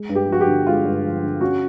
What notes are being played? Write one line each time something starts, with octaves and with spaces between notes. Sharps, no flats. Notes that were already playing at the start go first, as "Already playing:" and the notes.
Already playing: G#3
G2
G4
F3 F#4
G4
D3
G#3 F4
G2
F3
D3
C#4 F#4